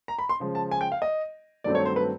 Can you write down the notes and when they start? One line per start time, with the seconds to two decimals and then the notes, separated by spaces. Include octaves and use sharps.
0.08 A#5
0.19 B5
0.29 C6
0.40 C#3 F3 G#3
0.55 A5
0.71 G#5
0.81 G5
0.92 F5
1.02 D#5
1.64 G2 D#3 F#3 A3 C4 D5
1.75 C#5
1.85 C5
1.96 B4